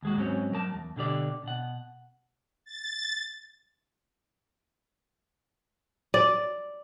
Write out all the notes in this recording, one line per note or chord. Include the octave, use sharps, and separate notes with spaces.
D#2 G#3 F#4
G#2 F#3 C4 C#4
F#3 A#4 A5
E2
B2 D3 G4 D5
B2 F#5
A6
D5